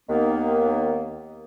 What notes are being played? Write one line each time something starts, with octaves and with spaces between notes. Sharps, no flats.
D#2 D#3 A#3 B3